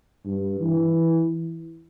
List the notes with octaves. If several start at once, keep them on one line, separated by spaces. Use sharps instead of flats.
G2
E3